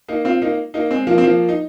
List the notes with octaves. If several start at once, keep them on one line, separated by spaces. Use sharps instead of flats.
A#3 D#4
C4 F4
A#3 D#4
A#3 D#4
G#3 C4
F3 A#3
C4
F3 A#3
D#4